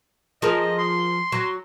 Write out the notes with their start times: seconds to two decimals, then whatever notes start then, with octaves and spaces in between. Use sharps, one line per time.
0.42 F3 G#4 A#4 D#5
0.78 C6
1.32 F#3